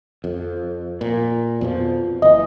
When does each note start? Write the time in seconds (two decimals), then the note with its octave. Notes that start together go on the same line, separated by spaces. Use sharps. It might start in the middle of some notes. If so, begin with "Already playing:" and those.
0.24 F2
1.01 A#2
1.61 F2 B2 F3
2.22 F#1 E3 D#5